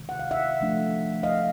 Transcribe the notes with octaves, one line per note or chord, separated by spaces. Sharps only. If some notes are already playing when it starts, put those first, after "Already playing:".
Already playing: C3 D#3 G#3
F#5
F5
E5 F#5
F3 A3 D4
D#5 F5